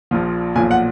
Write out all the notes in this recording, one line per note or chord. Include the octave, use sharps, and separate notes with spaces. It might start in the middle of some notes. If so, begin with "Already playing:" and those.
A#1 A#2 F3
B1 A#2 F3 G#5
F#5